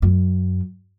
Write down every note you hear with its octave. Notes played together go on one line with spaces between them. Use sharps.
F#2